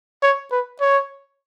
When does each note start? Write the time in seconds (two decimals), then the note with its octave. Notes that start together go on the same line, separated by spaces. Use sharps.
0.23 C#5
0.51 B4
0.81 C#5